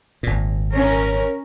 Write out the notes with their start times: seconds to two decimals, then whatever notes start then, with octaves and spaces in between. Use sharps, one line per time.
0.23 G#1 A#2
0.73 C#4 A#4